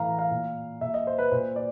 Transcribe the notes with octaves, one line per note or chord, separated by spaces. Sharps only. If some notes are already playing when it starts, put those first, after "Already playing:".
Already playing: A2 E3 F5 A#5
F5
A#2
A#2 E5
D#5
C5
B4
A#2 C5
D5